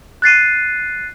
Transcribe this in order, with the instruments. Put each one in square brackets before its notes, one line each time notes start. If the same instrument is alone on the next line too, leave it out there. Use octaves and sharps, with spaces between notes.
[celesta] F#6 A6 C7 D#7